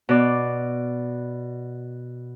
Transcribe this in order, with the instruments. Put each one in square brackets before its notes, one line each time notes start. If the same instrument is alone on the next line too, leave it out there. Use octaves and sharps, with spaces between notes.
[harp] B2 D5